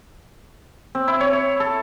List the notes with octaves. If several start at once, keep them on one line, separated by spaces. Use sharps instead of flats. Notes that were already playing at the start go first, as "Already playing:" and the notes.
C4
E4
C#5
C#5
A4